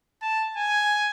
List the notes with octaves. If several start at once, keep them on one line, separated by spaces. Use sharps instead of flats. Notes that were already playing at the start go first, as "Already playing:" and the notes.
A5
G#5